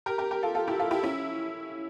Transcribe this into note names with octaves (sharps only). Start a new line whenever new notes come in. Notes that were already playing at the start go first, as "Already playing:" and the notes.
G4 A#4
G4 A#4
G4 A#4
F4 A4
F4 A4
E4 G4
F4 A4
E4 G4
C#4 E4